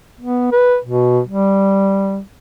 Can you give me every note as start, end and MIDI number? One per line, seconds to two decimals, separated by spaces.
0.21 0.51 59
0.52 0.77 71
0.84 1.20 47
1.27 2.19 55